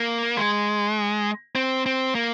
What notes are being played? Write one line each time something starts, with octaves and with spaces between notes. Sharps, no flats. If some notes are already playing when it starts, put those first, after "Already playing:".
Already playing: A#3
G#3
C4
C4
A#3